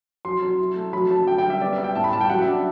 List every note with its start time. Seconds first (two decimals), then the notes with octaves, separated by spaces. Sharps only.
0.25 F#3 C6
0.42 F#3
0.59 E4
0.76 A3
0.93 F#3 B5
1.11 F#3 A5
1.27 D3 G5
1.38 G5
1.45 G3
1.50 E5
1.61 B3 D5
1.73 E5
1.78 B3
1.84 G5
1.95 A2 A5
2.04 B5
2.12 G3 A5
2.21 G5
2.30 F#3 F#5
2.41 E5
2.47 D4